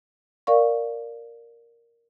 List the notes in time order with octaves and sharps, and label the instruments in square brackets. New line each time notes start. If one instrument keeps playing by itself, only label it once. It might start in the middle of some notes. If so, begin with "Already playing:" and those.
[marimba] A#4 D5 F5 C#6